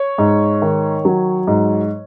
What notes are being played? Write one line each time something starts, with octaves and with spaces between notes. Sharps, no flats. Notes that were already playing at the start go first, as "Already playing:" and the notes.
Already playing: C#5
G#2
D#3
F#3
G#2